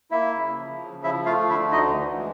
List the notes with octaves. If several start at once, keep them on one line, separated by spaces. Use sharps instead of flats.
A#3 E4 E5
C#3
F3
C#3
F3 E4 E5
A3 F4 F5
D3 E4 E5
D2 D#4 D#5
E3
G#3